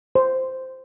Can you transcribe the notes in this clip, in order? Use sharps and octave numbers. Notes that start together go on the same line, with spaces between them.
C5